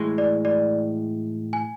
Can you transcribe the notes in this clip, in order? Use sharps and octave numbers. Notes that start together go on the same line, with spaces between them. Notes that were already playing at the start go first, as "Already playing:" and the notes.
Already playing: A2 E3 G#3
D5
D5
G#5